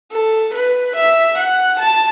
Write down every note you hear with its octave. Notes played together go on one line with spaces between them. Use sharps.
A4
B4
E5
F#5
A5